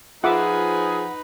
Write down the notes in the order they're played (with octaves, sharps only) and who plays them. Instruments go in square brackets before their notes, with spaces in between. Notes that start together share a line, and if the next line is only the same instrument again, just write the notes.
[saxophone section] F3 G#4 [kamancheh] D#4 B4 [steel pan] F4 E5 D6 [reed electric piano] F#5